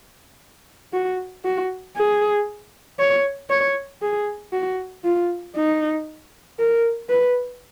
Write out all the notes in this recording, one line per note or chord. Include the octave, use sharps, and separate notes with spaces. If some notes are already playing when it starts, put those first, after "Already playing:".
F#4
F#4
G#4
C#5
C#5
G#4
F#4
F4
D#4
A#4
B4